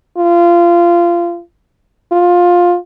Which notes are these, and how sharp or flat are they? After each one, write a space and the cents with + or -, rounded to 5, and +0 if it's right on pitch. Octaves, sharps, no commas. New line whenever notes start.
F4 -20
F4 +15